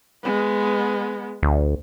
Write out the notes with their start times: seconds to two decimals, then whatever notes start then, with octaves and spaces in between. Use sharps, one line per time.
0.23 G#3 B3
1.43 D2